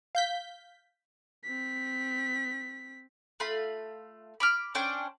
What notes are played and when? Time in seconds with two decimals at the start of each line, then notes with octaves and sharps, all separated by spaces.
0.15 F5 G6 B6
1.44 C4 B6
3.40 A3 F4 B5 C6
4.40 B5 D6 F6
4.75 C#4 D4 C5 G5